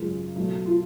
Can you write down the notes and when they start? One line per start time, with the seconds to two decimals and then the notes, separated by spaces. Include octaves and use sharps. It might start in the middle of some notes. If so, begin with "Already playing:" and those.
Already playing: G#1 F#2 C#3 G#3 F4
0.36 B1 B2 A3
0.66 F4